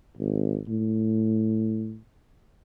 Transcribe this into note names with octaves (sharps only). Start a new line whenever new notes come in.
G#1
A2